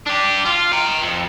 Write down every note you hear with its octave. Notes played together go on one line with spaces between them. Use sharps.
D4 G4
F4
G5 A#5
F2